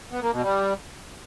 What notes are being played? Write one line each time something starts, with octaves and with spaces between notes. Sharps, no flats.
B3
A#3
B2
G3